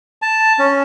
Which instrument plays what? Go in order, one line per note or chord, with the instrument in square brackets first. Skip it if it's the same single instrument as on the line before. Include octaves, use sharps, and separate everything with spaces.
[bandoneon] A5
C#4